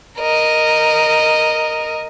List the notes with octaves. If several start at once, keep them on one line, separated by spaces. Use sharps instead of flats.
A#4 D#5